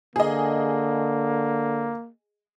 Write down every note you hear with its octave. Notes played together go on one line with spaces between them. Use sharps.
D3 A#3 G#4 D#5